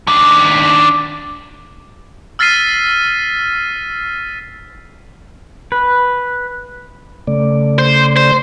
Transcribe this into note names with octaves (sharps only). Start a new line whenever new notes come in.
D#3 D4
E6 F6 A6 B6 C7 D#7
B4
C#3 A3 D5
C5
C5